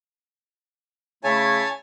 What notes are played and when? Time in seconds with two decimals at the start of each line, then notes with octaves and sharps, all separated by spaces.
1.24 C#3 A3 E4 C#5 G#5 A5